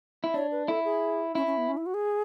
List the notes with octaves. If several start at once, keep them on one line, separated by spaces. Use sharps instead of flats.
E4
D4 C#5
B4
E4 A4
G#4
C#4 E4
C#4
B3
C#4
E4
F#4
G#4